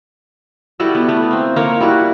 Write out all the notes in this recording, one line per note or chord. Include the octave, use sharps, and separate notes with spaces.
G3 E4 F#4 A4
B3
A3 B3
A#3 C4
A#3 A#4 C#5
G3 E4 F#4